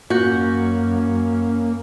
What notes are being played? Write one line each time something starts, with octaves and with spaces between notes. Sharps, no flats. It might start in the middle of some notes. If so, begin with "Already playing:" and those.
F#2 A#3 C#4 F#4 G6